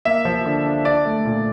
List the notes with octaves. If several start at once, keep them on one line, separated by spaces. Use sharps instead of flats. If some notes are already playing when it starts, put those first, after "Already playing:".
A#3 E5
F3
D3
D4
D4 D5
A3
A#2